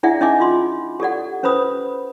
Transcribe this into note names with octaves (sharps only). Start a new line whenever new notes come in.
D4 E4 G#4 D5 E5 F#5
C#4 D#4 D#5 E5 G#5 D6
F4 C6
G4 A4 D5 F#5
C#4 B4 C5 B5 D#6